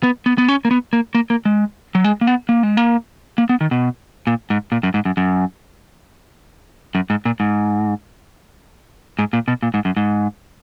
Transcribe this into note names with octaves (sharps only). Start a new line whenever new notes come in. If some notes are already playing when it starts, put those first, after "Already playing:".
B3
B3
B3
C#4
A#3
B3
A#3
A#3
A#3
G#3
F#3
G#3
A#3
B3
A#3
G#3
A#3
A#3
B3
D#3
B2
A#2
G#2
A#2
F#2
G#2
F#2
F#2
F#2
G#2
A#2
G#2
G#2
A#2
B2
A#2
G#2
F#2
G#2